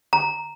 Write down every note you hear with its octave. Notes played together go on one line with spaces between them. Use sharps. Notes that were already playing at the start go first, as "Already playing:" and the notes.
A#5